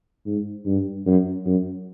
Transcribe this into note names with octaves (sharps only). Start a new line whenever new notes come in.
G#2
G2
F#2
F#2